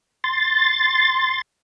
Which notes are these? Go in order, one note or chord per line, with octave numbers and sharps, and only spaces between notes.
C6 A6